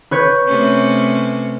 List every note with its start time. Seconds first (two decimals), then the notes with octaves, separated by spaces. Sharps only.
0.11 B4 C#5 G6
0.47 C3 A3 C#4